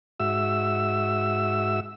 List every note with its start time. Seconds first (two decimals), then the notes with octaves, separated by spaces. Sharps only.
0.20 G#2 F#4 E5 E6